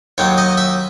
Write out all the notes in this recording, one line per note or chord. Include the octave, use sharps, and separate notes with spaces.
D#2 D#3 F#3 C#5
D#5
E5